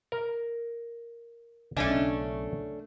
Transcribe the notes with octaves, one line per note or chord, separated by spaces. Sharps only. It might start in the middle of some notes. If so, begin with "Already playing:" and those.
A#4
B1 C#3 A3 C#4 D4 D#5 G#5